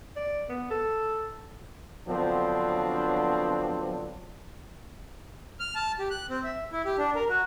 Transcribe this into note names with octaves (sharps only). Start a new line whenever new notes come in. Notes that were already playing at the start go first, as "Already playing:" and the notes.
D5
B3
A4
D3 F3 F#3 B3 C4 D4
F6
A5
G4
F#6
C4
E5
E4
G4
D4
A#4
F#4